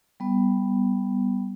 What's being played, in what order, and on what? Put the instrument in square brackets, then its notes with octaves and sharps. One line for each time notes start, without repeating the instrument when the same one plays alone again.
[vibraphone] G3 B3